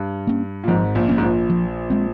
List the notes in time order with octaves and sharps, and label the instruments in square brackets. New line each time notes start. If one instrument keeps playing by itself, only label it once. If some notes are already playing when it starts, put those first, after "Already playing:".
Already playing: [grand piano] G2
[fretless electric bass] A#3 C#4
[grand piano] A#2
[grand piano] G#1 G#2 [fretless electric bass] F3
[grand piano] A#1 A#2
[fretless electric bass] A#3 C#4
[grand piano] G#2
A#1 A#2
[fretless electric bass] F3
G#3 C4